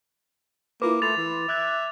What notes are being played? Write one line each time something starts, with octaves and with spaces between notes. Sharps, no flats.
A#3 E4 F4 B4 D6
A3 B5 C6 A6 F7
E3
E5 D6 F#6 G#6